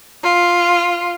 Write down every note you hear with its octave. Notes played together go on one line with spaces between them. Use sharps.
F4